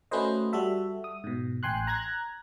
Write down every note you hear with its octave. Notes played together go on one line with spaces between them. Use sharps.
A3 C#4 F#4 B4 C5 D#5
G3 F#4 A4 E5
D#6
G#2 B2
A1 G5 G#5 C6 F#6
A#5 F#6 G#6 A#6